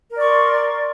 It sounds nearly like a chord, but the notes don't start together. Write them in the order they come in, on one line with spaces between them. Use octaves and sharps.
A#4 D5 C#6 C6